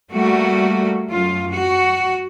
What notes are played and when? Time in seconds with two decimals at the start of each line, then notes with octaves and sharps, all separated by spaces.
0.12 G3 A3 A#3 F#4
1.10 F#2 F4
1.54 F#4